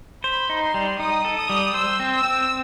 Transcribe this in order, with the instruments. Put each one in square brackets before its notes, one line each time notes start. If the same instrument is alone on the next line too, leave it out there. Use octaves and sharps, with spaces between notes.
[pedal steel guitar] C5 [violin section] B5
[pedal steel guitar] D#4
[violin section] C6
[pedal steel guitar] G3
[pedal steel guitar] D#4 [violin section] D#6
[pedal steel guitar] A4
[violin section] D#6
[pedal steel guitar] G3
[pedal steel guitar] C5 [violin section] E6
[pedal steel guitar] C4
[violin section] E6
[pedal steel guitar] C4